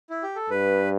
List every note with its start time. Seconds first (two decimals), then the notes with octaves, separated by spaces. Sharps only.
0.10 E4
0.23 G4
0.36 A4
0.50 G2 B4